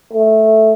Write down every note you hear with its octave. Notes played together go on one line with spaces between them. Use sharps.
A3